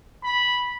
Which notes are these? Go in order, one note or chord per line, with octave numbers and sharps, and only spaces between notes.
B5